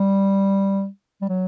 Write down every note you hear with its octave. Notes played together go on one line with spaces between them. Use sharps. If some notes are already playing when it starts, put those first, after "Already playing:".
Already playing: G3
G3
F#3